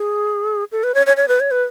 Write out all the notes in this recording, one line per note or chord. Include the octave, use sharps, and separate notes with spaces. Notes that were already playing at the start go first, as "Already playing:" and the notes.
Already playing: G#4
A4
B4
C#5
C#5
C#5
B4
C#5
B4